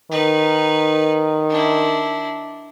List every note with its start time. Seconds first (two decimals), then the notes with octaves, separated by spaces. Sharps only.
0.11 D#3 D#4 B4
1.50 D4 E4